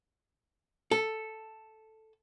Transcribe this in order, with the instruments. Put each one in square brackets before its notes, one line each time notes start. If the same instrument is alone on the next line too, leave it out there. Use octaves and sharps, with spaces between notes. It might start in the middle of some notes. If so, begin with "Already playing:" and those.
[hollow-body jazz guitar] A4